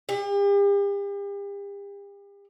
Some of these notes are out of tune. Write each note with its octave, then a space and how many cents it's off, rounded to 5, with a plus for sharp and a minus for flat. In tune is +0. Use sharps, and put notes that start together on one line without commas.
G4 +40